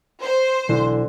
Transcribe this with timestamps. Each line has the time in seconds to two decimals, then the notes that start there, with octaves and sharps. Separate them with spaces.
0.23 C5
0.69 B1 D3 E3